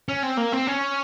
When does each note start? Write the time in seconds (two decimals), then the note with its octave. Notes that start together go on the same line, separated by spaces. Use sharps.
0.09 C#4
0.23 C4
0.38 A#3
0.53 C4
0.67 C#4